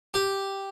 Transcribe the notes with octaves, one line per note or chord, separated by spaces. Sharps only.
G4